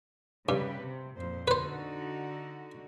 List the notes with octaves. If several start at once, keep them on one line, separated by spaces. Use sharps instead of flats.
G2 C#3 G4 B4
C3
F2 A#2 C5
D3 D#4 F#4 B4 C5